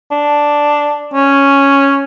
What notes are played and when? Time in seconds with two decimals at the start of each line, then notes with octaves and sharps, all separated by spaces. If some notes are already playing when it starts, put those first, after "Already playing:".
0.12 D4
1.13 C#4